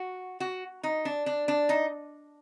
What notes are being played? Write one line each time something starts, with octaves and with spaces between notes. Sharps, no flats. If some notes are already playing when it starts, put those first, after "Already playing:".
Already playing: F#4
F#4
D#4
D4
D4
D4
D#4